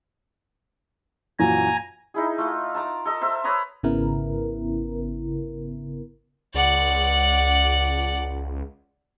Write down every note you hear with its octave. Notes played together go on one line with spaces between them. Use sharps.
F#2 A#2 E3 G#5 A#5
D#4 E4 G#4
A3 F4
A5 A#5 D6
A4 D#5
A4 A#4 C5 E5
B4 C#5 A#5 D#6
G#1 C#3 B3 E4 A#4
C#2 D5 F#5